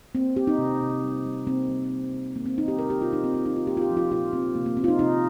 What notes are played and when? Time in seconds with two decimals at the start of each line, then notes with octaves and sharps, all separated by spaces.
0.15 A#3 C4
0.36 A#3 G4
0.47 D#4
0.58 C3
0.81 C3
1.03 G3
1.25 G3
1.47 A#3 C4
1.69 G3
1.92 A#3
2.13 A#3
2.35 D#3 A#3
2.46 C4
2.57 A#3 D#4
2.68 G4
2.79 C3 A#4
2.90 G4
3.01 C3 F4
3.13 D#4
3.23 A#3 C4
3.34 C4
3.46 A#3 D#4
3.56 F4
3.67 A#3 G4
3.77 F4
3.82 G4
3.90 F3
3.97 F4
4.11 A#2 F4
4.33 A#3 C4
4.55 C3 A#3
4.66 A#3
4.77 A#3 C4
4.84 F4
4.88 D#4
4.99 C3 D#4